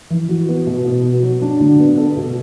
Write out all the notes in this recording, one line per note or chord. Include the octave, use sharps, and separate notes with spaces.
E3
F#4
B3
B2
B3
F#4
F#3
D4
D3
B3
A4
B2